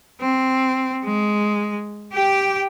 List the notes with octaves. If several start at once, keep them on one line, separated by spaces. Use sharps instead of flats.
C4
G#3
G4 G5